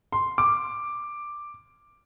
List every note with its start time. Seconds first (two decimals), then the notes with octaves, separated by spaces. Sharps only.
0.12 C6
0.38 D6